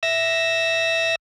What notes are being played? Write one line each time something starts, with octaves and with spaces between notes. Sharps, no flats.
E5 E6 A#6